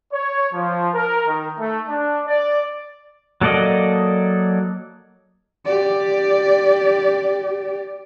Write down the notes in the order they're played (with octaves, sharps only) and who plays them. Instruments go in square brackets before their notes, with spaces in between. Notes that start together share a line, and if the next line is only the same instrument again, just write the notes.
[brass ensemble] C#5
F3
A#4
D#3
A3
D4
D5
[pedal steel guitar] F#3 A#3 A4 D5 D#5
[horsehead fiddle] G4 D5